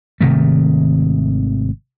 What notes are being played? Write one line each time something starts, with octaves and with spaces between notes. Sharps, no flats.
G#1 C3 D#3 A3